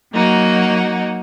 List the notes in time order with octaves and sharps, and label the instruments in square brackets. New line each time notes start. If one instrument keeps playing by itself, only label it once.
[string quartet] F#3 A#3 D#4 F#4